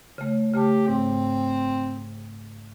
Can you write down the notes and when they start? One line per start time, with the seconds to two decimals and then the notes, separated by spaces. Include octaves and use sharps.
0.18 C#3 A3
0.53 C#3 A3 G4 A5
0.88 G#2 C4